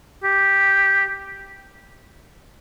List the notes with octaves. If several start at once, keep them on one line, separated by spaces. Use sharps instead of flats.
G4